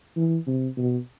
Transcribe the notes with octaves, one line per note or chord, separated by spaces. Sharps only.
E3
C3
B2